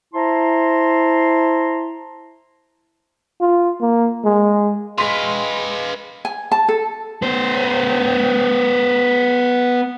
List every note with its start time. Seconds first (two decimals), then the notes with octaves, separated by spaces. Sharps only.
0.14 E4 C5 A5 A#5 C6
3.40 F4
3.81 A#3
4.24 G#3
4.98 G#3 B4 F5 C6 B6
6.25 G#5
6.52 A5
6.69 A4
7.22 B3 C5